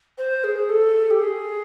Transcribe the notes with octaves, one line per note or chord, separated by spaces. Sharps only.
C5
G#4
A4
G4
G#4